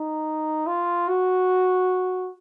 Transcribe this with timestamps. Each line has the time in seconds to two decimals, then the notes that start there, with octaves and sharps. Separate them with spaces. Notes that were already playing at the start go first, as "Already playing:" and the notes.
Already playing: D#4
0.67 F4
1.08 F#4